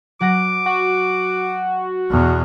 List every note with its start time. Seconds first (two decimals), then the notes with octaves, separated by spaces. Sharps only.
0.21 F#3 F#5 D6 A#6
0.66 F#4
2.10 E2 B2